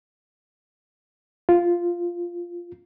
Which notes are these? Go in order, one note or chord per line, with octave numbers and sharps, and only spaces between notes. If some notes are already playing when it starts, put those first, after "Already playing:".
F4